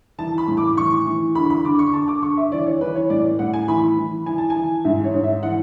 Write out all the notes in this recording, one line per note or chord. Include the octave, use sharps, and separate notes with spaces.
E3 A5
B5
A2
D6
E3 C#6
E3
D3 B5
B5
D3 D6
C#6
D3 A5
D6
D3 C#6
E5
E3 D5
C#5
E3 B4
C#5
A2 D5
A2 F#5
G#5
E3 B5
E3
E3 G#5
A5
G#5
E3
G#2 E5
C#5
G#2
E5
E3 F#5